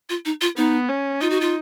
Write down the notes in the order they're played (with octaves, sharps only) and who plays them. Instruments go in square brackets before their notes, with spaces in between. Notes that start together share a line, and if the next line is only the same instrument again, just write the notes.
[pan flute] F4
D#4
F4
[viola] B3 [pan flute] D#4
[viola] C#4
[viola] D#4 [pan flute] F4
[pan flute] F#4
F4